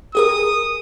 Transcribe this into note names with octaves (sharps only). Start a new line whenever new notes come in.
G4 G#4 A#4 D#6